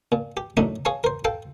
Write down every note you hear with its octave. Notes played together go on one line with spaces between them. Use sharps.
A#2
G4
F#2 A2 F#3 A3 D4 D#4
G#4 C#5 F5 A5
A#4 C5
A4 F5 G5 A5